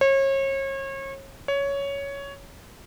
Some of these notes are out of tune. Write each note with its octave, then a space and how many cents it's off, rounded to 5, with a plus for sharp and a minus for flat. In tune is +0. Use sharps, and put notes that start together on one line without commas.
C#5 -35
C#5 +10